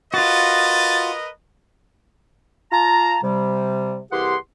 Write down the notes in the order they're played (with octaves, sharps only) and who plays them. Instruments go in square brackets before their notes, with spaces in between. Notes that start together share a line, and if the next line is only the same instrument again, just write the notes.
[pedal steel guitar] F4 F#4 [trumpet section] A#4 B4 D#5 [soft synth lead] A6
[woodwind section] F4 A5 A#5
C3 G3
C2 E3 G4 G#4 F#5 C6